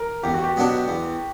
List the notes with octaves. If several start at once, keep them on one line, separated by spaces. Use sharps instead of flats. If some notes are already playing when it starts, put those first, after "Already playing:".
Already playing: A#4
E2 G4
F#4
G4
B2 F#3 B3 D4
E2